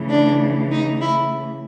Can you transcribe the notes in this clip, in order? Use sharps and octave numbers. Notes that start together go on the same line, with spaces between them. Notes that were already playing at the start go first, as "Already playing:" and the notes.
Already playing: C#3 E3 A3
D4
D#4
E4